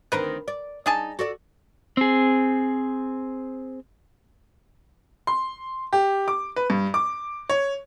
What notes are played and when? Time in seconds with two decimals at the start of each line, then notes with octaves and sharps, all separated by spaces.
0.12 D2 D#3 C4 A#4 B4
0.48 D5
0.86 D4 D#4 G#4 A5
1.19 F#4 A4 D5
1.97 C4 G#4
5.27 C6
5.93 G4
6.28 D6
6.56 B4
6.70 G2
6.94 D6
7.49 C#5